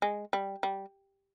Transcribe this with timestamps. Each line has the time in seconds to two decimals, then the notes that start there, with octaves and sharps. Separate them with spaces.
0.02 G#3
0.33 G3
0.63 G3